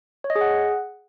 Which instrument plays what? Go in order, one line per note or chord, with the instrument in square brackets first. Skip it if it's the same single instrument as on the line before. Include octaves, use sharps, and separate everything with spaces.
[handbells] C#5
D#5
G#4
F#5